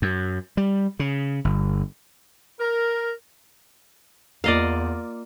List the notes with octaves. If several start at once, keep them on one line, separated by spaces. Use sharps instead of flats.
F#2
G3
C#3
G1
A#4
E2 A#3 F4 D5 D#5 F5